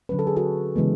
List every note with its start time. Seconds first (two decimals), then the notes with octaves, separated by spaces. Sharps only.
0.09 D3 F#3 C#4 B4
0.19 A4
0.27 G#4
0.36 F#4 A4
0.76 C#3 E3 G#3 B3